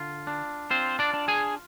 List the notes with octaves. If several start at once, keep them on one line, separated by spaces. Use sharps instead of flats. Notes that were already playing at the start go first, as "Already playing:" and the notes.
Already playing: D3 F4
D4
C4 F4 C5
D4 D5
D4
G#4 G#5